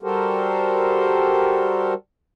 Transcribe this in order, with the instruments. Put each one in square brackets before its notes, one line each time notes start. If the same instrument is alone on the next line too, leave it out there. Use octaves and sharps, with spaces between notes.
[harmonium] G3 F#4 G4 A4 A#4 C5